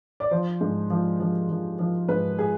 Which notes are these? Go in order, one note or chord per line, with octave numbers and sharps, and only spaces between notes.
D5
F3 C5
G#2
F3
F3
F3
F3
G#2 B4
G#4